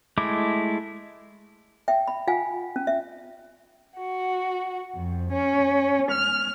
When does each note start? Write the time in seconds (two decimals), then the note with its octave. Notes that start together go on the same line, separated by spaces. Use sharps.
0.18 G#3 A3 E4 D6
1.88 E5 G5
2.08 B5
2.27 F4 F5 F#5 G#5
2.76 C#4
2.87 E5
3.98 F#4
4.95 F2
5.32 C#4
6.11 F6